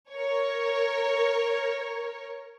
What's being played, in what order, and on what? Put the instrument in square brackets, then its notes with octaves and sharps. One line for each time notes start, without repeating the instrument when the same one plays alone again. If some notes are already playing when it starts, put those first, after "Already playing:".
[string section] A#4 C#5